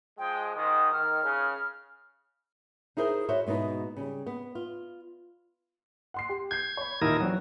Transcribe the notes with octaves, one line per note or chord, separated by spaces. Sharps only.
F3 G#3 G5
G#2 D#3 D#6
D#3 F6
C#3
D#4 E4 G#4 A#4 C5
E4 F#4 A4 C5 C#5 E5
G#2 B2 B3 D#4 E4
C#3 G3
B3
F4
F#5 C6 C7
G4
G6 G#6 C7
C#5 B5
D#2 A#2 D#4 E4 A#4
E3 F#3 C4 D4